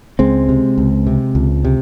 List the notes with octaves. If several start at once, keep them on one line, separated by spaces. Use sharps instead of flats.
C#2 G#3 C4
C3
C#2
C3
C#2
C3